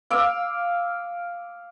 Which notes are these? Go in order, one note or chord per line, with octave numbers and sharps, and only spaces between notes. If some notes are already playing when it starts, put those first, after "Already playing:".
F5 D6 E6